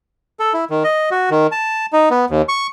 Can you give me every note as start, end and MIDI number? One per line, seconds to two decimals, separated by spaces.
0.40 0.53 69
0.53 0.65 64
0.70 0.83 51
0.84 1.10 75
1.11 1.30 66
1.31 1.47 51
1.52 1.86 81
1.93 2.09 63
2.11 2.25 59
2.30 2.42 39
2.49 2.67 85